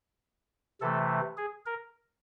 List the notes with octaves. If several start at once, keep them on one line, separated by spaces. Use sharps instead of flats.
C3 E3 A3 A4
G#4
A#4